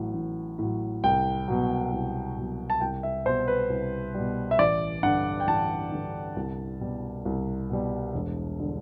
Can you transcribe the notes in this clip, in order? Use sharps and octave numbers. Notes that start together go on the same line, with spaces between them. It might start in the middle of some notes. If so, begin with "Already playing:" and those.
Already playing: A1 A2 F#3
A1
A2 F#3
C2 G5
B2 F#3
C2
B2 F#3
A5
C2 G5
E5
B2 G3 C5
B4
C2
B2 G3
E5
A1 D5
G2 D3 F#5
G5
A1 A5
G2 D3
C2
B2 G3
C2
B2 G3
E1
D3 G3